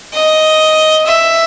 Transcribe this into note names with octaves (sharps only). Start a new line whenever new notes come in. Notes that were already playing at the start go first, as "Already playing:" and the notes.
D#5
E5